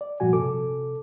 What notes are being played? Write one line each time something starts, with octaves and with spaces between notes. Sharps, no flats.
D5
G2 A#2 F3 F#4 G#5
C3 A4 D6